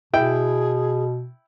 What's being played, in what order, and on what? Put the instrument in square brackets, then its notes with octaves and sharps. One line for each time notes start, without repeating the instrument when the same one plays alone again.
[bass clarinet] B2 [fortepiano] E4 G5 [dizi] G#4